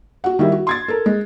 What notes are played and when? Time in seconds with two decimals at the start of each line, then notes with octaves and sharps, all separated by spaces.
0.24 F#4 F#5
0.39 D#3 G3 E4
0.52 F#4
0.67 C6 G#6 A6
0.88 A4 A#4
1.06 G#3